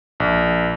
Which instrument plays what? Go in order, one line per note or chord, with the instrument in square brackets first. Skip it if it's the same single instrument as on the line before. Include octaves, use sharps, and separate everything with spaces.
[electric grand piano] A#1